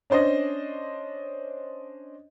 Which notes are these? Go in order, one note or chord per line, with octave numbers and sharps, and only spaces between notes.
C#4 D4 C5 C#5 D#5